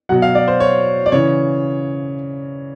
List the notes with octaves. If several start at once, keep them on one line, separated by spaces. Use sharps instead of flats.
B2 F#3 F#5
F5
D5
C5
C#5
D5
C#3 E3 C#5